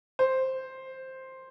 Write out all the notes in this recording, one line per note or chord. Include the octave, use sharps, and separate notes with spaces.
C5